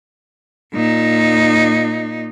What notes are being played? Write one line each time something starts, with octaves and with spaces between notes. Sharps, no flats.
A#2 D#4